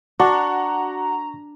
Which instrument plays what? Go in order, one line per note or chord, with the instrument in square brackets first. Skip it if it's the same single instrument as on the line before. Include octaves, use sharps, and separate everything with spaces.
[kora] D4 [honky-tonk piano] F#4 [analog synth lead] A#5 [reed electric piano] C#6